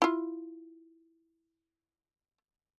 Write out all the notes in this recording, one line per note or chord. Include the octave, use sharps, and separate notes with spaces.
E4 F4